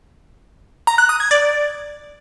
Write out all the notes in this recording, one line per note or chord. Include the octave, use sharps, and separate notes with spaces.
A#5
F#6
D#6
G#6
D5